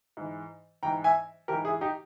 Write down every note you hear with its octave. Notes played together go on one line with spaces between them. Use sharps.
G#2 E3
G#2 E3 G5 A#5
E5 G#5
G#2 E3 G4 A#4
E4 G#4
D#4 G4